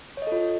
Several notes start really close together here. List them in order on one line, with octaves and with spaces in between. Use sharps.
C#5 D#5 A4 F4